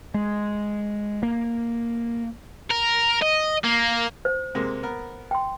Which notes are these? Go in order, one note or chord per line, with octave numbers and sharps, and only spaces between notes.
G#3
A#3
A#4
D#5
A#3
C5
C3 G#3 A#3
B3 A#4
G5 C6